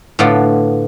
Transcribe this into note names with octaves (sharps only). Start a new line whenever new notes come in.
A2 D3 B3 F4 D5 F#5